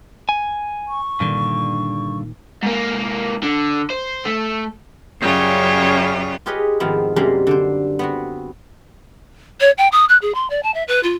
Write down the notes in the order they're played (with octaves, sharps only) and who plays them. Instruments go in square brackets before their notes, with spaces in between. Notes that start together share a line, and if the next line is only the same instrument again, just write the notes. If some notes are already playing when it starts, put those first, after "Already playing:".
[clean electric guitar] G#5
[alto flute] C#6
[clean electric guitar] G2 D3 [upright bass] A#2 D#3
[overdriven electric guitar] G#2 A#3
D3
C5
A3
[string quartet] F#2 C#3 G3 F4
[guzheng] F4 G4 G#4 B4 C#5 D#5
G#2 D#3 F3 B3 C4 E4
F#2 C3 G3 G#3 A#3 C5
D3 D4 C5
B3 C4 F#4
[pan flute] C#5
G5
D#6
F#6
G#4
C6
D5
A5
E5
B4
F4